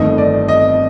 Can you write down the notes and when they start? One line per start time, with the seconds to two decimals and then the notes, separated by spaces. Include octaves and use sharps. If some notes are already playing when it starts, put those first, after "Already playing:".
Already playing: G1 F2 D#3 A3 D#5
0.18 D5
0.48 D#5